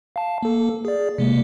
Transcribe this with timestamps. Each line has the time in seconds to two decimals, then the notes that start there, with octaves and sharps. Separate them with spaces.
0.16 F5 A5
0.43 A#3 A4
0.85 G#4 D5
1.18 C3 G#3 A#3